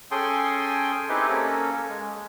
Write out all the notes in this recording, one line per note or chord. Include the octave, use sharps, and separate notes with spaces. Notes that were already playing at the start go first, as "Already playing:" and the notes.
C#4 G#4 A4 G5 G#5 C6
C4 D#4 E4 G4 G#4 B4
A#3 C#4 A4
G#3